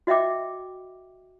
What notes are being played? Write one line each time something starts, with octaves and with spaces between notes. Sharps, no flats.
F#4 D#5 E5 G5 D6